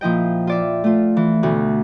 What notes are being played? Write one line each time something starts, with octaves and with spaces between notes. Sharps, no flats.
A#2 F3 E4 D#5 G5
F4 D5 E5
A3 F4
E3
D2 B2 F#4